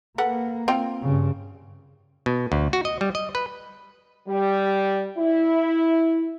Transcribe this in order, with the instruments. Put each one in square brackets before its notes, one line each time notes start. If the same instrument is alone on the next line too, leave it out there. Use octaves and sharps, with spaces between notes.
[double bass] A#3 [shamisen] A4 B4 F#5
[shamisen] C4 F4 G5
[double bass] G2 C#3
[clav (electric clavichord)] B2
D2
F#4
D#5
G3
D#5
B4
[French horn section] G3
E4